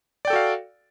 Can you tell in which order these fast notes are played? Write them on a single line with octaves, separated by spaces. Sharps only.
D5 G5 A4 F#4 F5